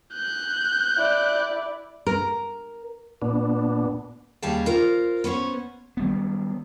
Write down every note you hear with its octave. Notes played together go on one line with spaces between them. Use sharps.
F#6 G6
E4 D5
A#4
A#2 B3 D4
D#2 C#3 G3 G#4 F5 A5
F4 A#4 C5
B3 C#4 C5 C#5
D#3 G3 B3